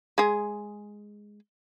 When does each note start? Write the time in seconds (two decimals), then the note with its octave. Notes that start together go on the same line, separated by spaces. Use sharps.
0.18 G#3 G#4